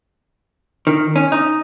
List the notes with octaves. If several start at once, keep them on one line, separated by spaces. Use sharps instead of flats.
D#3
C#4
D#4